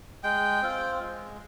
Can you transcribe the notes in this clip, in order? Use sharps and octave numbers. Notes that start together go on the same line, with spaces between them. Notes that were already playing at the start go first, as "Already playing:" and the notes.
G#3 G5
C4 F4
G#3